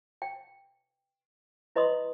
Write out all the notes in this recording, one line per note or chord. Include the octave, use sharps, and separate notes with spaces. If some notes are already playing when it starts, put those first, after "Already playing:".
G5
E4 B4 D#5 B5 C6 D#6